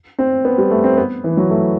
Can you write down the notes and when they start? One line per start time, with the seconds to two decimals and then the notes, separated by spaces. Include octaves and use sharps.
0.19 C4
0.45 B3
0.58 G3
0.71 A3
0.84 C4
0.97 B3
1.24 E3
1.37 F#3
1.50 A3